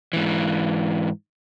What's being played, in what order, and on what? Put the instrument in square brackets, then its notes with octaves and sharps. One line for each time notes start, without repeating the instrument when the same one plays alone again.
[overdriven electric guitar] G#2 E3